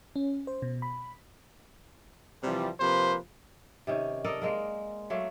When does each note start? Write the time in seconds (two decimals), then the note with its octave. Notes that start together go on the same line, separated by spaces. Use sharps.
0.16 C#4
0.47 C5
0.62 B2
0.82 B5
2.43 C3 E3 F3 G3
2.80 C3 F3 A#3 B4 C5
3.87 C3 D#3 C#4
4.24 A4 A#4 D5 D#5
4.42 G#3 A#3 A#4
5.10 F#3 A3 A#3